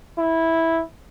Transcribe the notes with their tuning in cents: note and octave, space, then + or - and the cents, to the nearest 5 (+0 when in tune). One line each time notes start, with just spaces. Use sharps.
E4 -10